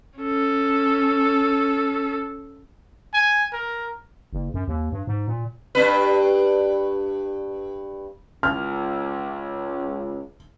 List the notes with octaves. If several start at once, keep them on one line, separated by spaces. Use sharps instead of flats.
C#4 A4
G#5
A#4
F#1
F#2
D#2
G2
G#2
A#2
G2 D4 B4
C#2 F6